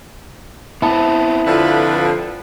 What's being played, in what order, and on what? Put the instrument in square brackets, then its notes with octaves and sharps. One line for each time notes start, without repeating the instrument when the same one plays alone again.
[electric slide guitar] B3 C4 [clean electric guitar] E4 A5
[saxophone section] F2 D3 F3 [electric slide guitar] B4